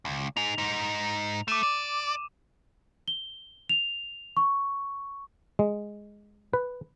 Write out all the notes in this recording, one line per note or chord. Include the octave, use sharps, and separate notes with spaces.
C#2
D#4 G#4 F7
G#2 D#4
A3 D6 D#7 E7
D5
G7
F7
C#6
G#3
B4